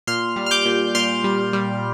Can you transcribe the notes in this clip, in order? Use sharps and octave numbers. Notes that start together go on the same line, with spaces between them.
A#2 C6 F6
G3
F6
D6 G6
A#2
A#2 C6 F6
G3
G3